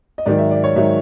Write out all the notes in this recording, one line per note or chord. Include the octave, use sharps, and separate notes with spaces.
D#5
G#2 D#3 F#3 D5
E5
D5
C#5
G#2 D#3 F#3 E5